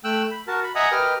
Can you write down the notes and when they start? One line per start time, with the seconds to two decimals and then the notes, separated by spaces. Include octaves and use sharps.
0.04 A3 G5 E6 F#6
0.31 B5
0.47 F#4 A#4 A5
0.63 B5
0.75 D#5 E5 F#5 G#5 A#5 D#6
0.92 G4 A#4 B4 D#5 G5 F6